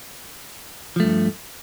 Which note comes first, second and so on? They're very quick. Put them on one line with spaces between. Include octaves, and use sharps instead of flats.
F3 A3 G2